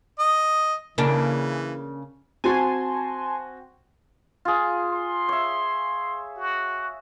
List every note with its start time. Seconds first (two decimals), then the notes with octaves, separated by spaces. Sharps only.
0.19 D#5
0.98 C#3 E3 A#3 D4
2.44 C4 F#4 G#5 A5 C6
4.45 F4 G#4
4.89 C6
5.29 C#5 E5
6.36 F#4